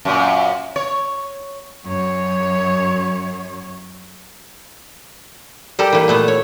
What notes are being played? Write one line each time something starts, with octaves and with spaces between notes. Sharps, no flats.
F#2 A#2
C#5
F#2 C#5
G3 G4 A4 A#4 D5
E3 A#3
A#2 A3 B3
C#5